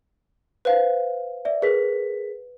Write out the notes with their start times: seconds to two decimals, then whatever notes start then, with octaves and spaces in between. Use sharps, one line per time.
0.65 B4 C5 F5
1.45 D5 E5
1.62 G#4 A#4 B4 B6